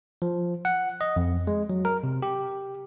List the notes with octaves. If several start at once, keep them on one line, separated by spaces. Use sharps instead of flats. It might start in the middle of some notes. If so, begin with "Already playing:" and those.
F3
F#5
D#5
F2
G#3
F#3
A#4
C3
G4